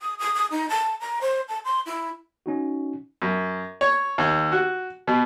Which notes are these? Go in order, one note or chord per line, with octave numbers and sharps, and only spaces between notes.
D#6
D#6
D#6
D#4
A5
A#5
C5
A5
C6
E4
C#4 D#4 F#4
F#2
C#5
D#2
F#4
B2